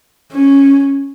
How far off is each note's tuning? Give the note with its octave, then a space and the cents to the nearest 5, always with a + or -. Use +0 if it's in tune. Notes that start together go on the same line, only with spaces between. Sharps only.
C#4 -5